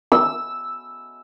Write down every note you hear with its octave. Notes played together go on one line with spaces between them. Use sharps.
E6